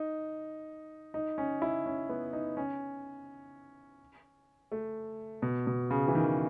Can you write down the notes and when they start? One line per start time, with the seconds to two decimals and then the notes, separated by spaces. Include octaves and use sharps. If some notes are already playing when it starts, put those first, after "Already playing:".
Already playing: D#4
1.14 D#4
1.38 C#4
1.62 E4
1.86 C#4
2.09 B3
2.33 D#4
2.57 C#4
4.72 A3
5.42 B2
5.67 B2
5.91 C#3
6.08 E3
6.15 D#3